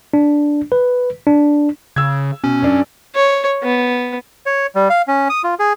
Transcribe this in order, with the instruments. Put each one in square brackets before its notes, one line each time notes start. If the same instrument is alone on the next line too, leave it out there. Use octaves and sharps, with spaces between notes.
[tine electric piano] D4
B4
D4
[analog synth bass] C#3 [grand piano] E6 G#6
[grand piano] B2 [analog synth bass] C#4
[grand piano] F#2 D4
[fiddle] C#5
B3
[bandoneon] C#5
G3
F5
C#4
D#6
F4
G#4